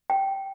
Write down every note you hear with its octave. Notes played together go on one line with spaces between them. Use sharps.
G5